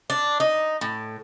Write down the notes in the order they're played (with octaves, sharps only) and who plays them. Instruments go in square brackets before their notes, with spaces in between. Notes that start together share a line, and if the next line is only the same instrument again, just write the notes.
[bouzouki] D4
D#4
A2